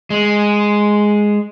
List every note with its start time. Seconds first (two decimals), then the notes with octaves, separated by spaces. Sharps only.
0.10 G#3